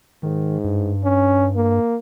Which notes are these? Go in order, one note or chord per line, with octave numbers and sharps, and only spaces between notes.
G#2 D#3
G2
C#4
A#3